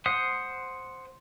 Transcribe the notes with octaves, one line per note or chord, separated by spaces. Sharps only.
C5 F#5 D#6